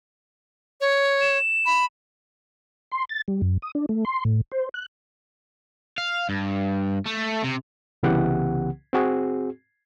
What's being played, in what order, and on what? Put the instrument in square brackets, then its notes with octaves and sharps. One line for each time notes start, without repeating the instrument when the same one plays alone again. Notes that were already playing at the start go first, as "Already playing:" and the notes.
[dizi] C#5
[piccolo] E7
[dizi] B5
[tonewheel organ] C6
A6
G3
F#2
D#6
D4
A3
C6
A2
C5
F#6
[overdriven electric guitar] F5
G2
A3
C3
[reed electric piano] C2 C#3 E3 B3 G4 F#5
C4 F#4 G#4